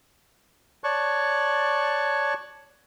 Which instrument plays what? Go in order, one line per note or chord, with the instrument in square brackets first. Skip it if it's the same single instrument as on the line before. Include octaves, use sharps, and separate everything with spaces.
[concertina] C#5 D5 A5 C#6 F#6